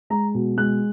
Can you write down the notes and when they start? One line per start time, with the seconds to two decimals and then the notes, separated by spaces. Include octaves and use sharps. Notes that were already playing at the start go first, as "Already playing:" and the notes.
0.10 G#3 A#5
0.34 B2
0.57 G#3 F#6